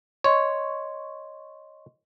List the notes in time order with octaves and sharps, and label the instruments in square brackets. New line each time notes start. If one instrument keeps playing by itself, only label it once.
[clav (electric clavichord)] C#5 [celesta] D#5 C6 C#6